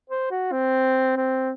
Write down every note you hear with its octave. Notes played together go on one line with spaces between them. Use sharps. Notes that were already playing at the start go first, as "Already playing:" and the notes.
C5
F#4
C4
C4